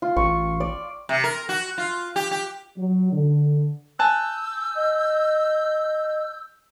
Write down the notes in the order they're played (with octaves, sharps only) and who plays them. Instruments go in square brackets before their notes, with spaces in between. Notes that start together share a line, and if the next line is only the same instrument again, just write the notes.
[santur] F4
[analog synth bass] A1 [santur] C#6
[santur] D5
[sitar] C3
A#4
F#4
F4
G4
G4
[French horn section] F#3
D3
[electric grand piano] G#5 A5 F#6 [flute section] E6 G6
[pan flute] D#5